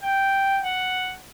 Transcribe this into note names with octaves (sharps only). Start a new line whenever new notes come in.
G5
F#5